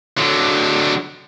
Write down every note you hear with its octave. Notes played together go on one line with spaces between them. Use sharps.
D3 F#3